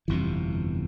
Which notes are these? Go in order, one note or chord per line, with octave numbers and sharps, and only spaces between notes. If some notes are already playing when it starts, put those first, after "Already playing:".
G1 F2 C3 E3